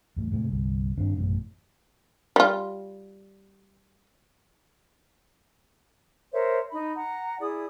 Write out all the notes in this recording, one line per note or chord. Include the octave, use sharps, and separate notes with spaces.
E2 A2
A2 C3 G#3
G1 C2
G2 D#3 C4 D4
A1 F#2 B2
G3 F4
A#4 C5 C#5 E5
D#4 B5
F#5 A#5
E4 G#4 D5 D#6